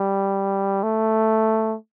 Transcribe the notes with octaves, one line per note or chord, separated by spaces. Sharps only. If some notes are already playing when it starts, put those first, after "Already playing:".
Already playing: G3
A3